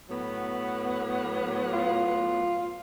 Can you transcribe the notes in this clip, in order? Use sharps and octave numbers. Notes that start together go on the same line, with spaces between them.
A2 F#3 B3
F4